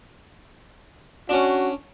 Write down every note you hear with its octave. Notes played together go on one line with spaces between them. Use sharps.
C#4 D4 F#4